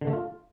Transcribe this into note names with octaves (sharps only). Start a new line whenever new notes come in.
D3
A3
F4